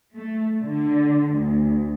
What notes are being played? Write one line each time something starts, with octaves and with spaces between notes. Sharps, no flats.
A3
D3
D2